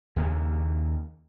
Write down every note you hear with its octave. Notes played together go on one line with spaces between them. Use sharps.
D#2 C#3 A#3